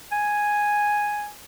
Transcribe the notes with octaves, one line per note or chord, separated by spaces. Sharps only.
G#5